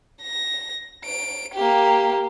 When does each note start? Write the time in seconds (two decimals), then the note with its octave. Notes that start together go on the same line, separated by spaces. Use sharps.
0.22 A#6
1.05 D7
1.55 A#3 G4